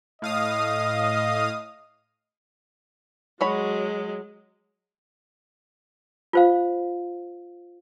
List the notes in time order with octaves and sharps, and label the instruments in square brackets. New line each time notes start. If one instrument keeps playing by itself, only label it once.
[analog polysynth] A2 F5 D#6 [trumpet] D#5
[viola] F#3 G#3 [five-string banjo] F#4 C#5 B5
[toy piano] F4 C5 F5